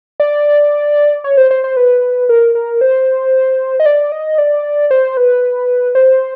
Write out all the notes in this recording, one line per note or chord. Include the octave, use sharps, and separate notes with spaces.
D5
C#5
C5
C5
C5
B4
A#4
A#4
C5
D#5
D5
D#5
D5
C5
B4
C5